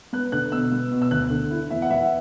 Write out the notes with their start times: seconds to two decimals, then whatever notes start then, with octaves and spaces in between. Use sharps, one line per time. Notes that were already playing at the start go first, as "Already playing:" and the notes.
0.13 B3 F#6
0.32 D3 F#6
0.52 B2 E6
0.72 B3
0.91 B2
1.02 E6
1.11 D2 F#6
1.30 D3
1.51 E4
1.70 E2 E5
1.82 F#5
1.90 E3 E5